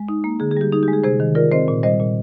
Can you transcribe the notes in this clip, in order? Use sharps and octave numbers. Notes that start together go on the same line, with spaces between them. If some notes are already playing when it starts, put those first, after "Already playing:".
Already playing: G#3
D#4
A#3
D3 G#4
G#4
G3 G4
D#4 G#4
G4
G#3
G#4
C3 G#4 C5
D#3
F4 A#4 D5
C4 C5 D#5
A#2
G3 C5 D#5
A#2